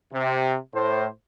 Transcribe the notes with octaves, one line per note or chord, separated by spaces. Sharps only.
C3
A2 C5